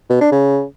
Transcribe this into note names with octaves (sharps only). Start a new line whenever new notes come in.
B2
D4
C#3